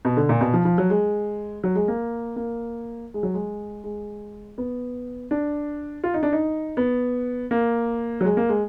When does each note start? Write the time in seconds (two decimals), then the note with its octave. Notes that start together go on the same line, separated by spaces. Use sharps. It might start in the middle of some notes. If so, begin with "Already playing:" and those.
0.05 B2
0.17 D3
0.29 A#2
0.41 B2
0.54 F3
0.65 F3
0.78 F#3
0.90 G#3
1.64 F#3
1.75 G#3
1.88 A#3
2.36 A#3
3.14 G#3
3.23 F#3
3.34 G#3
3.84 G#3
4.58 B3
5.31 D4
6.04 F4
6.14 D#4
6.23 D4
6.33 D#4
6.77 B3
7.51 A#3
8.21 F#3
8.25 G#3
8.37 A#3
8.49 G#3